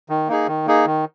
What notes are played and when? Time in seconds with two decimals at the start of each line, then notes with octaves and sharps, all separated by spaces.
0.09 D#3
0.28 A#3 D#4 G#4
0.47 D#3
0.67 A#3 D#4 G#4
0.86 D#3